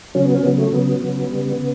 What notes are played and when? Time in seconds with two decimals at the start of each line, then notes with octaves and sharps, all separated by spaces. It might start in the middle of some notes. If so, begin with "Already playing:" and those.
0.15 C#3 F#3 C#4
0.25 B3
0.35 C#4
0.43 C#3 F#3 B3
0.57 A3
0.72 C#3 F#3 B3
1.02 C#3 F#3
1.30 C#3 G3
1.58 C#3